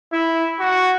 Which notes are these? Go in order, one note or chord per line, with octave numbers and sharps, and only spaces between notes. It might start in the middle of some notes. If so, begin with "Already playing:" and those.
E4
F#4